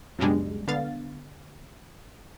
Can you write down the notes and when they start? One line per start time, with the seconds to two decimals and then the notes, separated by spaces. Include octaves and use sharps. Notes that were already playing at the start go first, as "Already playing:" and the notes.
0.19 C#2 F#2 B2 G3 G#3 D4
0.68 D3 B3 F5 A6